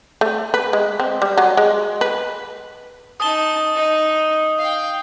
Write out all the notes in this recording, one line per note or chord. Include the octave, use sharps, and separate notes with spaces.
A3
B4
G#3
C4
G3
F#3
G#3
B4
D#4 A5 D#6 G7
D#4
F5 G5